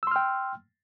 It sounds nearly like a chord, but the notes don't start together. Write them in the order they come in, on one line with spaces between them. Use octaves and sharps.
E6 C6 F6 G5